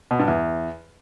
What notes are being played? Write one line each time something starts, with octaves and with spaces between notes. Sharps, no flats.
B2
G2
E2